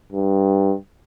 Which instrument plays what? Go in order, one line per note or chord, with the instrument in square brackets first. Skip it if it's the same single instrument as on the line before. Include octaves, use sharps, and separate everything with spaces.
[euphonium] G2